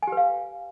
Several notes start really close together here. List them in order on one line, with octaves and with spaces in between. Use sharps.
G#5 G4 B4 F5